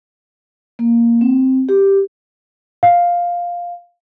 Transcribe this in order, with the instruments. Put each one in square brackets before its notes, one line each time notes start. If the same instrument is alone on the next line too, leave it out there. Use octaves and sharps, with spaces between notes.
[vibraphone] A#3
C4
G4
[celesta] F5